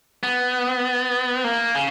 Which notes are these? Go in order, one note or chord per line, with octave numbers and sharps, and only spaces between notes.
B3
A#3
C#3